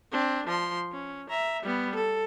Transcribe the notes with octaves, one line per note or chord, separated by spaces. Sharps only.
C4 D4
F3 C6
C#4
E5 A#5
G3 B3
A4